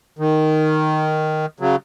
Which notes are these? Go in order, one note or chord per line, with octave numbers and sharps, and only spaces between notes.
D#3
C#3 F#3